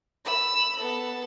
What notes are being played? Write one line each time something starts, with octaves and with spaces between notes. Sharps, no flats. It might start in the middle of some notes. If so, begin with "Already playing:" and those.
B5 E6
B3 A4